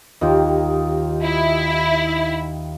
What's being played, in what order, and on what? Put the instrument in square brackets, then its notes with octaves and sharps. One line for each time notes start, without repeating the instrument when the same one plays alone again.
[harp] D#2 [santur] D#4 F4 G4
[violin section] E4